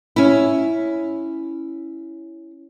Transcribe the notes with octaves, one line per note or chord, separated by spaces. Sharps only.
C#4 E4